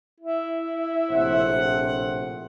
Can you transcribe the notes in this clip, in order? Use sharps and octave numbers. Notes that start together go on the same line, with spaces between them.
E4
A#1 A2 C3 C5 F#5